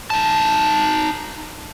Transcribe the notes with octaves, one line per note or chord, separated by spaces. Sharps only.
D#4 A5